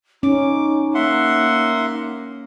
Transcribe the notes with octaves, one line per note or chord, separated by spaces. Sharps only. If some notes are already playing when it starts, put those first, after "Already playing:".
C#4 D#4 D6
A#3 E5 F#5 C6